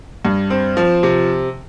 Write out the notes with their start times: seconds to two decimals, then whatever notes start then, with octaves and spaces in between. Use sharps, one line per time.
0.25 G2
0.50 C4
0.77 F3
1.03 C3